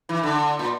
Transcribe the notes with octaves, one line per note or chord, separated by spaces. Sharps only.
E3
D3
A#2